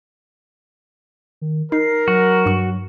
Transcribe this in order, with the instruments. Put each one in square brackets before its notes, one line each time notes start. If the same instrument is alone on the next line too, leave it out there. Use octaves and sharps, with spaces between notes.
[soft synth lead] D#3
[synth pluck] D#4 [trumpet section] A#4 [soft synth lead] C7
[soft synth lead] F#3 [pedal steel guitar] F#4
[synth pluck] G2 C#6